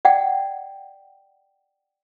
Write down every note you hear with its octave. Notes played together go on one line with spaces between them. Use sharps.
D5 F#5 G5